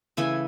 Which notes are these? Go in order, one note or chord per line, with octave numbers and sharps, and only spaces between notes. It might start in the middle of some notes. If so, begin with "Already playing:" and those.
C#3 E3 A3 E5 G#5